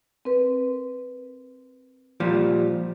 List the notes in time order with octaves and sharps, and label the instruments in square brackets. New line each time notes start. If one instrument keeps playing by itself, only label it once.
[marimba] C4 A#4 B4
[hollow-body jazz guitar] A#2 F3 G3 [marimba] G4